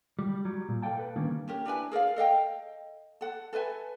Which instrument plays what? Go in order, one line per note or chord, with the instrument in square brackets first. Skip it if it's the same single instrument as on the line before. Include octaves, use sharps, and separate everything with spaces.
[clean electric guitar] G3
F#3 G3
A#2
A4 D5 F5 G5 A5
A4 B4
D#3 G3 A#3 C#4 D4
[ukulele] C#4 G4 A#4
D4 E4 B4 G#5
G#4 A#4 D5 F5
A4 D#5 F5 G5
A4 F#5
A4 B4 E5 G#5